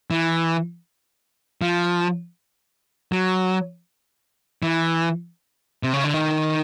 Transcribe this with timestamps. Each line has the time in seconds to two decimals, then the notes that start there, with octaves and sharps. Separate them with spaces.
0.11 E3
1.62 F3
3.12 F#3
4.63 E3
5.83 C3
5.93 C#3
6.04 D3
6.14 D#3